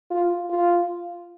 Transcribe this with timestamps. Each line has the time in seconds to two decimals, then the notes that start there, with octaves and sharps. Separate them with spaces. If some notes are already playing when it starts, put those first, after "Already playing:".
0.11 F4
0.50 F4